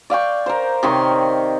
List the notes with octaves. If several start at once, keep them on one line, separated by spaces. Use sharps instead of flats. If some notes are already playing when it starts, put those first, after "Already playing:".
D5 F5 G5 C#6
A#4 C5
C3 D#3 C#5 C6